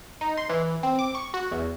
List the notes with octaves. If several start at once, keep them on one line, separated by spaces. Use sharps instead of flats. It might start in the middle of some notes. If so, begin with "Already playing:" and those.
D#4
C6
E3
C4
D6
C#6
F#4
E2